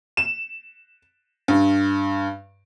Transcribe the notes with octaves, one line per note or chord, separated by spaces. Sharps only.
E7
G2